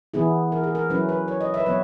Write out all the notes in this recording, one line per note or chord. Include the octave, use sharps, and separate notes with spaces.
E3 B3 E4 G#4
A#4
G#4
A#4
F#3 C#4 E4 B4
B4
C#5
D#5
E5
B4
F#3 B3 C#5